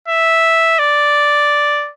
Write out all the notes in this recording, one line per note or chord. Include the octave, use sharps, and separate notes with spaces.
E5
D5